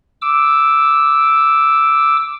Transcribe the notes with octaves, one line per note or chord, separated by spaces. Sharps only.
D6 E6